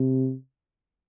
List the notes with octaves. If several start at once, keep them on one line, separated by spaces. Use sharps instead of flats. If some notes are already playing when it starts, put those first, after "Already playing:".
Already playing: C3